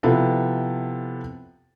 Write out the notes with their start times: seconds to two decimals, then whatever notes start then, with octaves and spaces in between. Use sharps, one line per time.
0.03 C3 F3 B3 E4 F4 A4